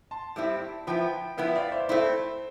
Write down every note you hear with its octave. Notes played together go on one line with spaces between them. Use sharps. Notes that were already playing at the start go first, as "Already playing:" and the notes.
A5 C6
A2 G3 C4 E4
F3 B3 E4 G5 B5
F3 B3 E4 E5 G5
D5 F5
C5 E5
A3 C4 E4 C5